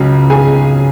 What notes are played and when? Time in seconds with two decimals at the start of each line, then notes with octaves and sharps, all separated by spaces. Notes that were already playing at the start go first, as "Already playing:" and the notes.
Already playing: C#2 C#3 F#3
0.30 G#4 G#5